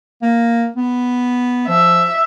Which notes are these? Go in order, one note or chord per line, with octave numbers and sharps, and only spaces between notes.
A#3
B3
F3 E5